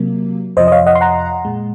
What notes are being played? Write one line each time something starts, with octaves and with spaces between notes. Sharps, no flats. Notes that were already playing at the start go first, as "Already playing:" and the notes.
Already playing: C3 F#3 A#3
F2 C3 F3 C5 D#5
D#5
C#5 F5
D#5 F#5
C6
F#5 A#5
A#2 G#3